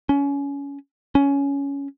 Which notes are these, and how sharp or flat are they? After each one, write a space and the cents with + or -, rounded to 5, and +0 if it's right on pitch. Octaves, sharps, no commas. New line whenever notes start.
C#4 +25
C#4 +15